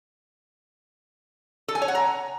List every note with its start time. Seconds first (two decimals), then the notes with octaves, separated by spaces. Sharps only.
1.68 A4
1.75 G#5
1.82 C#5
1.88 F#5
1.95 A#5